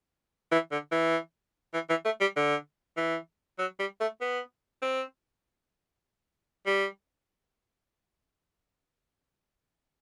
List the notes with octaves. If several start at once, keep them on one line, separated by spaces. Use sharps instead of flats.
E3
D3
E3
E3
E3
A3
G3
D3
E3
F#3
G3
A3
B3
C4
G3